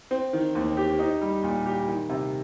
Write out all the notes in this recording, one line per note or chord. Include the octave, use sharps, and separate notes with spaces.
C4
D#3
D#2
G4
D#4
G3
A#2
G4
D#3
C3